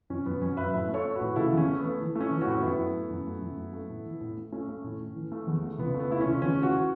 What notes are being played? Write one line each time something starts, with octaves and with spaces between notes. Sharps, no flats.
F#2 C#4
F#2 B3
F#3 C#4
F#2 B4 E5
A2 B4 E5
A3
A4 C#5
A3
F#4 B4
A2
C#3 E4 A4
E2 C#4
A3
B3
A3
E3
A3
C#4
E3
C#4 F#4
A2
F#2 B3 E4
A3
A3
F#2
A3
F#2
A3
A3
A2
E3
A2
A3
A3 C#4
A3
A2
A2
E3
A3
E2
A3
C#2 B3
A3
B3
A3 E4
C#2 C#4
E2 C#4
E3
C#4 F#4